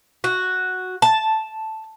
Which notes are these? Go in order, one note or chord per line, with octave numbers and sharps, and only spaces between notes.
F#4
A5